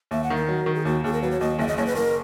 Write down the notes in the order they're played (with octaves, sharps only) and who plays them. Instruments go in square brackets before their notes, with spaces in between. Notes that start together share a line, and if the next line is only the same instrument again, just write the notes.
[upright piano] D#2 [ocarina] E5
[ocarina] F#5
[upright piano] D#3
[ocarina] A#4
[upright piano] F#3
D#3
[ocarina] G#4
[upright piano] D#2 [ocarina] F#4
[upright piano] D#2 [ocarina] G#4
[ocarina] A#4
[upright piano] F#3 [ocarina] B4
[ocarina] C#5
[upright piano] D#2 [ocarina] D#5
[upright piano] F#1 [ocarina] E5
[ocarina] D#5
[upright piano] F#1 [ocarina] C#5
[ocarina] B4
[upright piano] F#1 [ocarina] A#4